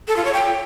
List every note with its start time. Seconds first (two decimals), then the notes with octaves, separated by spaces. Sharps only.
0.08 A4
0.17 F4
0.25 C#5
0.34 G5